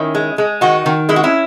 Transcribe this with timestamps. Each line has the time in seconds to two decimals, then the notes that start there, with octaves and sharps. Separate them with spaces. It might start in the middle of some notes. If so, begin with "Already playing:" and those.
Already playing: D#3 C#4 E4
0.15 G#3
0.38 G#3
0.61 D#3 D#4 F#4
0.86 D#3
1.09 G#3 E4
1.16 F#4
1.24 C#4 E4